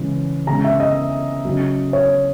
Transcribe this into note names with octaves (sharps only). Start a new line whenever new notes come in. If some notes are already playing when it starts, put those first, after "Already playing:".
Already playing: C#3 E3 G#3
C#3 G#3 A#5
E5
D#5
C#3 F#3
C#5